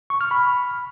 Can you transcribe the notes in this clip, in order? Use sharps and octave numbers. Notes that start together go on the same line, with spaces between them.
C#6
F6
B5